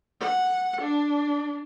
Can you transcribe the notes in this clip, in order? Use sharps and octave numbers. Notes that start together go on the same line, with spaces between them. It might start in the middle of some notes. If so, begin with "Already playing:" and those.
F#5
D4